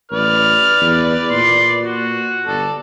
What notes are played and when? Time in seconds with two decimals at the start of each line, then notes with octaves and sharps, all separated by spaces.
0.12 A1 B4 D5 F6
0.81 E2
1.31 A#2 C6
1.83 F#4
2.46 G1 A4 D5